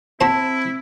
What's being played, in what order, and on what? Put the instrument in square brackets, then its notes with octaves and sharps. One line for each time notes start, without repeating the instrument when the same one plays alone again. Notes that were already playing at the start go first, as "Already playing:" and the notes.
[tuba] C4 [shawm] E4 [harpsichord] F#4 C5 [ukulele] A5